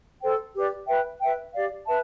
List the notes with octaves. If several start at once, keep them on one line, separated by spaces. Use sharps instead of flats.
A4 C5 G5
G4 B4 D5
B4 E5 G5
B4 E5 G5
G4 D5 F5
B4 E5 A5